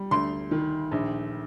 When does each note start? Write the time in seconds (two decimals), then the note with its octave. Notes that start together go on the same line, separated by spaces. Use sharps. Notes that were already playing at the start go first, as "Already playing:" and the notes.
Already playing: G3
0.11 D2 C6
0.51 D#3
0.92 A#1